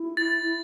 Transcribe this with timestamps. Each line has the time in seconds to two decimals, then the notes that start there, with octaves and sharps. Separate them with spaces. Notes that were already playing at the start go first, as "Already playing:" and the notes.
Already playing: E4
0.17 A6